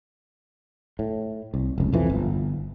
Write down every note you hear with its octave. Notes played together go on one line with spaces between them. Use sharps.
A2
C2
F1 C#2
B1 F2 E3 F3
G1